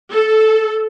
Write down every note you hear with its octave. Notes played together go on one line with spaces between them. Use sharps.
A4